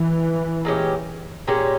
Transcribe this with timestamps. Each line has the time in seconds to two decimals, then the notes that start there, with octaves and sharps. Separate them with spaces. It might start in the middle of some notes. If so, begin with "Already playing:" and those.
Already playing: E3
0.65 A#2 G#3 C#4 G4
1.47 A#2 G#3 C#4 G4